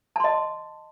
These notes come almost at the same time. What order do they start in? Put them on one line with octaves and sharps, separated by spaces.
A5 C6 D#5